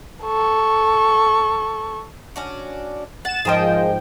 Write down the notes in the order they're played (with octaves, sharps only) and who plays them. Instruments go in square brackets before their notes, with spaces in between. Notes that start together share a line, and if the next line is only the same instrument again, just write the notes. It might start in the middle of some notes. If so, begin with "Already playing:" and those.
[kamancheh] A4 C#6
[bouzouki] C#4 D4 F#4
[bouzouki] F#5 [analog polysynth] A6 E7
[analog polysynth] G#2 F3 G5 [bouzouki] G#4 A#4 D#5